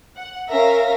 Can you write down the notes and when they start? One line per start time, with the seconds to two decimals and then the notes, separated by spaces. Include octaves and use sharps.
0.16 F#5
0.50 C#4 A#4 E5 F5 A#6